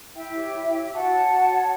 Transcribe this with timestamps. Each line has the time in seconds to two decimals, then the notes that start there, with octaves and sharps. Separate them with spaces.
0.14 E4 E5 G5
0.34 G4 C#5
0.53 E4
0.72 G4 C#5
0.92 F#4 F#5 A5
1.12 C#5
1.31 F#4
1.51 C#5